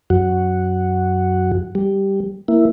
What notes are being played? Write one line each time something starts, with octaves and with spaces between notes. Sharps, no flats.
F#2 F#4
G3
A#3 E4